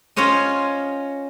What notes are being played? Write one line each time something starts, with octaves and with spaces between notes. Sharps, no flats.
C#4 F4 C5 C#5 D#5